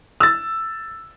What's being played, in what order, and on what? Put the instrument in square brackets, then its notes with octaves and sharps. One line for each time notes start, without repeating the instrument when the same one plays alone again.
[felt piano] E6 A6